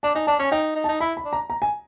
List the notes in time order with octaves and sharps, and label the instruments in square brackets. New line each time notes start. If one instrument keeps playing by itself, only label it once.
[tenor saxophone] D4 [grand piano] A5
[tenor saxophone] D#4 [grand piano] G#5
[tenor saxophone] D4 [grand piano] A5
[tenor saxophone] C#4 [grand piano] G#5
[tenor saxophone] D#4 [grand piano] G5
[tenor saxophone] D#4
[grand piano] A5
[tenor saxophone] D#4
[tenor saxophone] E4 [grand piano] B5
[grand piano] B5
[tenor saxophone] D4
[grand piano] A#5
A#5
G#5